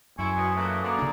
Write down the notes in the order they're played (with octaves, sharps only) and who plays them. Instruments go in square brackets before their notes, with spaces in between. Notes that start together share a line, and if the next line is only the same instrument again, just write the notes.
[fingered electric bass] F#2 [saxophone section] A2 E4 [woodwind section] G#5 C6 C#6
[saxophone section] B2 [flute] D#6
[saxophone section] A#2 E3 [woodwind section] A3 A#3 F#4
[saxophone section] F#2 B2 D3 [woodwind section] A#3 D5
[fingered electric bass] C#3 D4